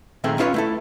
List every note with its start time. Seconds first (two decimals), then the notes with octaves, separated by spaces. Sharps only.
0.24 A#2 D#3 A3 C4 G#4 A4
0.38 C#4 E4 F4 B4 C#5
0.54 A3 E4 A4